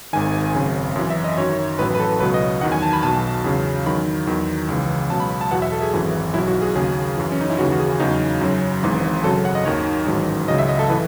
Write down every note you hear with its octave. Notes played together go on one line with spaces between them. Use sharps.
G#1 G#2 D#3 G#5
G#1 F#2 C#3
F#2 E3
E5
D#5
F#2 D#3 F#3 C#5
A1 A2 F#3 B4
B4
A4
C#2 B2 F#3 B4
D#5
E2 D#3 F#3 F#5
G#5
A5
B5
B1 B2 F#3 A5
E2 C#3 F#3
E2 D#3 F#3 B5
E2 D#3 F#3
C#2 C#3 E3
C#2 B2 F#3 A5
B5
B5
A5
E2 B2 F#3 F#5
E5
A4
G#4
G#1 F#2 E3
B1 B2 F#3 E4
F#4
G#4
D#2 C#3 F#3 G#4
F#2 E3
C#4
D#4
E4
D#2 C#3 E3 F#4
F#4
G#4
E2 C#3 F#3 D#4
F#2 C#3 F#3
G#1 G#2 E3
F#2 C#3 F#3 A4
F#5
D#5
D#2 D#3 F#3 C#5
A1 G#2 D#3 F#3
C#2 C#3 F#3 D#5
E5
D#5
A4
A2 E3 B4